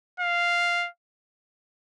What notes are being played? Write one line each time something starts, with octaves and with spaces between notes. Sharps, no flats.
F5